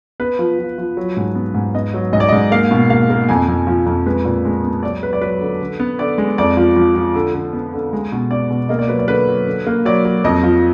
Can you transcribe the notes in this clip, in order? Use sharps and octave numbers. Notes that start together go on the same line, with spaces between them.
B3 B4
F3
F3
F3
F#3
G#2
B3
G#2
B3 D#5
F#3
G#2 D#5
D5
G#2 D#5
A#3 F5
B2
A#3 F5
A#3
F2 G#5
F2
F3
F2
G#3 B4
A#2
G#3
B3
F#3 D5
F#3 B4
D5
F#3 B4
D3
D3
B3
D3 D5
G#3
F2 D5
F3
F3
F3
D3
D3
B3
D3
G#3
B2
B3 D5
B2
A#3 D#5
D5
F#3 B4
D5
D3 B4
F#3
D3
A#3
F#3 D5
F#3
F2 D#5
F3